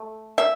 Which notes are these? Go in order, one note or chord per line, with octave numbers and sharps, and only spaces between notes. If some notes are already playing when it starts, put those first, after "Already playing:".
Already playing: A3
E5